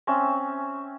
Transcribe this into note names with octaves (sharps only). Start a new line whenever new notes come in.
C4 C#4 E5